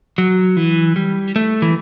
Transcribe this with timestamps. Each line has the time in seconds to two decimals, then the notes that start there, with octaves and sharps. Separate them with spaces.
0.18 F#3
0.57 E3
0.96 G3
1.36 A3
1.62 E3